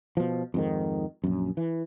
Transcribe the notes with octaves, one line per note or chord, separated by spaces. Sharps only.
B2 F3
F2 G#2 D#3
A#1 F#2
E3